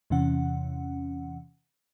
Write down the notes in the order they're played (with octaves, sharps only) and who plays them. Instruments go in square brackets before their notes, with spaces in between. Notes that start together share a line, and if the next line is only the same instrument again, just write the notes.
[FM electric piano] E2 C3 E3 C#4 F#5